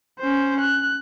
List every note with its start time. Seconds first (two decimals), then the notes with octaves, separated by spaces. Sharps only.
0.19 C#4 C5
0.60 F#6